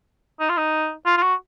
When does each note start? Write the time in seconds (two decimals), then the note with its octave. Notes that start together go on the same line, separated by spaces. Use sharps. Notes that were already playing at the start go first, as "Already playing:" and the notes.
0.41 D#4
0.49 F4
0.57 D#4
1.06 F4
1.18 F4
1.23 F#4